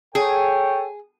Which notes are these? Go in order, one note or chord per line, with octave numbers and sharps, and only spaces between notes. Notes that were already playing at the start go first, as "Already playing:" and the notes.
G#4 A4 C#5 G5